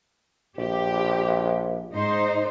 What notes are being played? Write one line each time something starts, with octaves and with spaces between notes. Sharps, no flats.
A#1 G4
G#2 D#4 C5